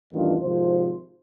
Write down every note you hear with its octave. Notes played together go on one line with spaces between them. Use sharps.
A1 E2 G2 D#3 D4 F4
G#1 C3 F3 C5